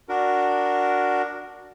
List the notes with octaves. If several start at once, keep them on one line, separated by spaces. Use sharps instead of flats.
D4 F#4 A#4